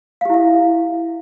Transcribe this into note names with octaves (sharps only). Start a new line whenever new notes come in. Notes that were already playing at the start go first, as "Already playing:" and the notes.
E4 G4 E5 F5